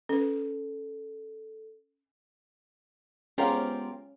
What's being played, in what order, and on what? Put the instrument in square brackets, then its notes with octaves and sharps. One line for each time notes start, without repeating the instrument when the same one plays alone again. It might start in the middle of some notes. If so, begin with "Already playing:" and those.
[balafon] C#4 B4 [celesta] A4
[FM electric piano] G#3 B3 C5 [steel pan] C#4 F5 [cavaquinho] F4 G4 A#4